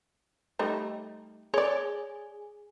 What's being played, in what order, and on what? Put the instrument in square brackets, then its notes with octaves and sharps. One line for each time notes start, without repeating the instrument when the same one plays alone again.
[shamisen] G3 A3 D#4
[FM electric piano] G#4 [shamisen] C#5 D5